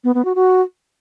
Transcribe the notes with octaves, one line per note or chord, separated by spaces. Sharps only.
B3
B3
F#4
F#4